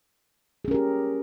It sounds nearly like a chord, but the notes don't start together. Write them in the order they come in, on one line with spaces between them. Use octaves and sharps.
G#4 C#4 A#4 G4